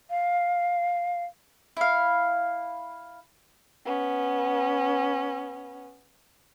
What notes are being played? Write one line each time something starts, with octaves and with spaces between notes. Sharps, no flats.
F5
E4 F5
B3 C#4